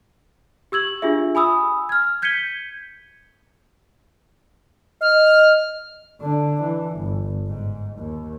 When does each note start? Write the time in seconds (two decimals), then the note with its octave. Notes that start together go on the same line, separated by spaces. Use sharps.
0.72 G4 E6 G#6 F#7
1.02 D4 F4 G4 G#4 E5
1.35 G#5 B5 D#6 E6
1.89 F6 G#6
2.22 G6 G#6 B6 C#7 D#7 G7
5.01 D#5 F6
6.21 D3 D4
6.62 E3
6.97 G1
7.47 G#2
7.98 D#2